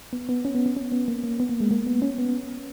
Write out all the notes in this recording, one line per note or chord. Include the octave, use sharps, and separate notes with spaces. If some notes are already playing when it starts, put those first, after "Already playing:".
B3
B3
C#4
B3
B3
C#4
B3
A#3
A#3
B3
A#3
G#3
A#3
B3
C#4
B3